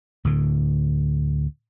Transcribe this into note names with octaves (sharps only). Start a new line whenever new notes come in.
D2 A2 D3